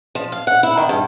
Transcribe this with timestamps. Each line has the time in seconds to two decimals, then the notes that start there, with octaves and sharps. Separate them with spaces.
0.15 F3
0.32 F5
0.47 F#5
0.63 E4
0.77 D#3
0.89 G2